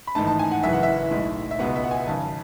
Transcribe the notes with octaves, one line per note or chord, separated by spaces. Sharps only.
B5
A1 G#2 D#3 A3 D#4 A5
A5
G#5
F#5
F#1 F#2 E3 E5
F#5
E5
B1 A2 G#3
E5
C#2 B2 G#3 B3 F#5
E5
F#5
G#5
G#1 F#2 C#3 A5